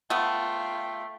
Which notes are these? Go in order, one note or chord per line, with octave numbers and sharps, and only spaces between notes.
A3 B3 F4 G5